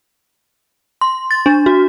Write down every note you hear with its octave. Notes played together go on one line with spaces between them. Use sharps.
C6
A6
D4
F#4